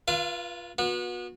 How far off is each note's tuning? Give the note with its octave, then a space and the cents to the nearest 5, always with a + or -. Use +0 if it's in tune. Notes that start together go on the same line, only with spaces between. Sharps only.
F4 +0 B4 -30 F5 -40
B3 -30 F#4 -35